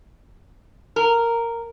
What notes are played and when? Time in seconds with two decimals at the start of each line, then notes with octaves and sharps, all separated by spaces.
0.96 A#4